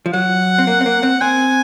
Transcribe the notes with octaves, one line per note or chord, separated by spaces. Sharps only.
F3
F#3 F#5
C4
A#3
C4
A#3
C4
C4 G#5